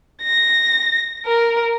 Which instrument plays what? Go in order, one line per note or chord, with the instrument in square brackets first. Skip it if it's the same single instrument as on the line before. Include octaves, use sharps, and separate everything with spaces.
[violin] A#6
A#4